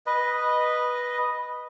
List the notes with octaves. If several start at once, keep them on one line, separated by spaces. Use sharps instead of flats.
B4 D#5